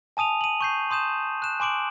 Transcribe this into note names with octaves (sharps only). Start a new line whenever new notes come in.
G#5 A5 D#6 D#7 F7
D#7 F#7
C#6 G6 C7
C6 D#6 G6 E7
F#6 E7
G#5 C6 D6 D7 F#7